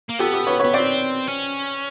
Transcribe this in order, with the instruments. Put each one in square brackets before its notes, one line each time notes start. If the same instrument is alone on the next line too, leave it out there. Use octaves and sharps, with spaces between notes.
[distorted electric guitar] A#3
[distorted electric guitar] B3 [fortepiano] G4 A4
[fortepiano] G4 A4
B4 C#5
[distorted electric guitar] B3 [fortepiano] B4 C#5
[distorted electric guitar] C4 [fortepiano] C5 D5
[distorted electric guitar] C#4